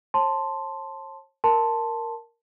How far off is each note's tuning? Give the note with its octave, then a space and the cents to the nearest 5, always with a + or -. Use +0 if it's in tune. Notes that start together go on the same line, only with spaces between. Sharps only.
C#5 -45 A5 +0 C6 +0
A#4 -5 A5 +0 C6 +0